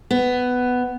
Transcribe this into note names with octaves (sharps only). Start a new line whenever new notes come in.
B3